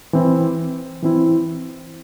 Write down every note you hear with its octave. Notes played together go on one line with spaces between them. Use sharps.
E3 C4 E4
E3 C4 E4